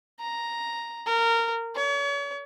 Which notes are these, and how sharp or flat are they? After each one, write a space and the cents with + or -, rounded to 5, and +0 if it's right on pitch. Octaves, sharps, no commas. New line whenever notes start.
A#5 +0
A#4 -20
C#5 +40